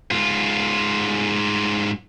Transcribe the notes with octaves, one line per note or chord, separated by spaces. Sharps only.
G#2 F4